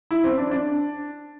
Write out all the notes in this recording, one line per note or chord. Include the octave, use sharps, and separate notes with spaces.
E4
C4
D4
D4